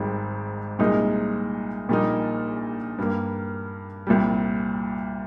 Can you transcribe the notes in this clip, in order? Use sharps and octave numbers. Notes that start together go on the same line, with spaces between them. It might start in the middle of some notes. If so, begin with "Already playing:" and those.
Already playing: G#1 G#2 G3
C2 A#2 G#3 D#4 A#4
A#1 A#2 G3 A#3 D#4
G2 G3 A#3
C2 A#2 G3